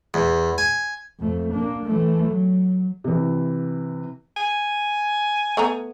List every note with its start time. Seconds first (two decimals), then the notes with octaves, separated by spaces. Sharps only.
0.14 E2
0.58 G#5
1.20 F2 A3
1.53 A#3 D4
1.86 E3 A3
2.27 F#3
3.04 C3 E3
4.37 G#5
5.57 A3 B3 A#5